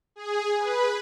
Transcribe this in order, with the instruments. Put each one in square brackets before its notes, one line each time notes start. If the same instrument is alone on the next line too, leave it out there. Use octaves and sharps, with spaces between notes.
[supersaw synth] G#4
B4